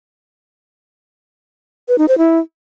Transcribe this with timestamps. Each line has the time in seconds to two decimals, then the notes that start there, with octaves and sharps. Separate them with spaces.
1.88 B4
1.98 D#4
2.08 C5
2.18 E4